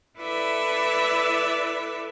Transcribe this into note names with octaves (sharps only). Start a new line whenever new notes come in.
E4 A4 B4 D5 E5